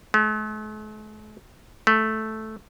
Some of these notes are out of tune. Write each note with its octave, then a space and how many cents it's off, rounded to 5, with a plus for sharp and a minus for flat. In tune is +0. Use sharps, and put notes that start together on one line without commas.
A3 -45
A3 -5